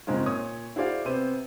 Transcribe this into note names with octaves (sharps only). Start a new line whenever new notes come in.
F#1 G#2 G#3 C4 F4
A#2 C#5 D#6
E4 F#4 G#4 C5 D5 F5
C3 B3 C5 D#7